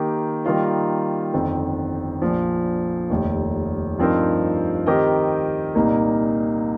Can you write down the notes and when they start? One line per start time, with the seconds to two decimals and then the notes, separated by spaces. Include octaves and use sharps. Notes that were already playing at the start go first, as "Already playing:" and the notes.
Already playing: D#3 A#3 G4
0.45 D#3 G3 A#3 F4 D#5
1.33 G1 F2 D#3 C4
2.22 A#1 A#2 F3
3.10 F1 D#2 D#3
3.98 G2 F3 C4 D#4 A#4
4.86 D#3 C4 G4 A#4 D#5
5.75 C2 A#2 A#3 D#4